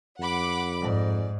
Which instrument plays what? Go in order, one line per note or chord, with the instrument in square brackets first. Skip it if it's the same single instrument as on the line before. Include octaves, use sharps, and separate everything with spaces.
[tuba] F2 [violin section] F#5 B5 D6
[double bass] G#2 [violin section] D5